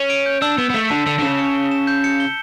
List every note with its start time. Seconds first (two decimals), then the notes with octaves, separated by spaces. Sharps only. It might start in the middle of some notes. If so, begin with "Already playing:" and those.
Already playing: C#4
0.10 D7
0.26 G6
0.42 D4 E6
0.58 B3 E7
0.70 B3
0.74 A3 B6
0.90 D3 A5
1.07 D3 E6
1.19 D3
1.23 C#3 E7
1.39 C#7
1.55 G7
1.71 E7
1.87 G6
2.04 C#7
2.20 G7